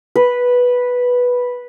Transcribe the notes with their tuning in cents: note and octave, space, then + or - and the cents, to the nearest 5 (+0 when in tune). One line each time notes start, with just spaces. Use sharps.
B4 -5